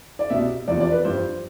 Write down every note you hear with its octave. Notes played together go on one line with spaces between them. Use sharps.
D5
C2 B2 E5
E2 C3 F3 D5
D5
B4
G2 F3 C5